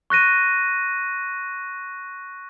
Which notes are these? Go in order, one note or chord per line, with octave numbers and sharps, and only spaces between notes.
C#6 F#6 A#6 D#7